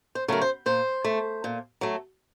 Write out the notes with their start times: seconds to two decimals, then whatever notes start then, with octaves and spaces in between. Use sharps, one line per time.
0.15 C5
0.28 C#3 F#3 A3 A#4
0.41 C5
0.66 A#2 C5
1.04 A3
1.44 A#2
1.81 F#3 A3